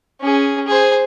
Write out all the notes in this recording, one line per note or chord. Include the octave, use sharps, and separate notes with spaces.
C#4 G#4
G#4 C5